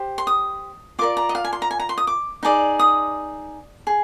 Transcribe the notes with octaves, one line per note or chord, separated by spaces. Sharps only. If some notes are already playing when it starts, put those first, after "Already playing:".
Already playing: G4 C5
C6
D#6
F4 A#4 D5 D6
A#5
D#5
F5
G#5
C6
A#5
G#5
A#5
C6
D#6
D6
D#4 G#4 D5
D#6
G#4